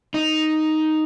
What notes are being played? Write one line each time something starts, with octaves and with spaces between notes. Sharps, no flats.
D#4